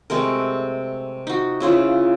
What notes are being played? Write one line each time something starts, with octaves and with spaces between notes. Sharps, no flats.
C3 G#3 A3 A#4
D#4 F#4
C#3 E4 F4 C5